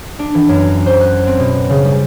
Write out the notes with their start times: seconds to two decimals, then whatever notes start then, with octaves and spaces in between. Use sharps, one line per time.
0.19 D4
0.35 E3
0.49 F#2
0.86 C5
1.01 F#6
1.27 C4
1.40 B2
1.70 C#3
1.85 G3